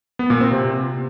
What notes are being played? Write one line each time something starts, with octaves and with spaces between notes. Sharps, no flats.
B3
A#2
C4
C3